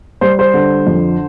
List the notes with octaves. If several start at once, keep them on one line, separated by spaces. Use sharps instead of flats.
G3 C5
C5
D3
F2